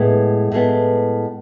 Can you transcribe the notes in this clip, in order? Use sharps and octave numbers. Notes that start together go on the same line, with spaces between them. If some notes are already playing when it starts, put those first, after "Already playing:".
Already playing: A2 G#3 B3
A2 G#3 B3